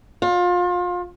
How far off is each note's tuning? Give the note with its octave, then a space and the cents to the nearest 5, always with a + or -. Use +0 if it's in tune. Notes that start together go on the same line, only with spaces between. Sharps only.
F4 +30